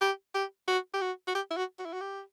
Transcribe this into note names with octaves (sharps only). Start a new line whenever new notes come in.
G4
G4
F#4
G4
F#4
F#4
G4
E4
F#4
F#4
E4
F#4
G4